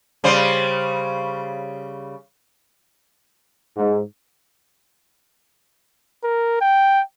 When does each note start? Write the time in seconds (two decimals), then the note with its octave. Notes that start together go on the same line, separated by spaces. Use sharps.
0.24 C#3 G3 C5
3.77 G#2
6.24 A#4
6.61 G5